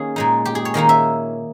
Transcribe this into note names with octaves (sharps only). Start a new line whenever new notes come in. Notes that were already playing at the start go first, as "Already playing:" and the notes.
Already playing: D#3 A#3 C#4 G#4
A#2 G#3 D#4
G4
G#4
C#5
D#3 A#3 D#4 D#5
E5